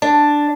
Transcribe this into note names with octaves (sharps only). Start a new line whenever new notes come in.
D4